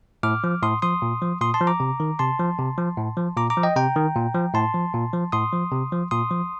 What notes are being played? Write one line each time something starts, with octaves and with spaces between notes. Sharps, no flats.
A2 D6 F6
F3
A2 C6 D#6
F3 C6 D#6
A#2
F3
A#2 C6 D#6
A5 C6
F3
A#5 D6
C3
D#3
C3 A5 C6
F3
C3
F3
A2
F3
A#2 A#5 D6
A#5 D6
F3
D#5 G5
C3 G5 A#5
D#3
A#2
F3
A2 A5 C6
F3
A#2
F3
A2 C6 D#6
F3
C3
F3
A#2 C6 D#6
F3